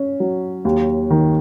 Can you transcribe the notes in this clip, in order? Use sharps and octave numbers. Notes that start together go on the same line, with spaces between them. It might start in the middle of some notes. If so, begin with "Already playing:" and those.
Already playing: C#4
F#3
D#2
D#3